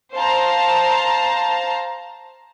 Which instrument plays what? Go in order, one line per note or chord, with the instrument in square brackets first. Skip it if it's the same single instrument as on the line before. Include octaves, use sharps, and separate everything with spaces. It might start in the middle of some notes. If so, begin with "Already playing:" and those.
[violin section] C5 F5 A5 A#5